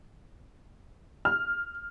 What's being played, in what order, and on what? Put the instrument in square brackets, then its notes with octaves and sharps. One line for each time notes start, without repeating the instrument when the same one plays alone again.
[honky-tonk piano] F6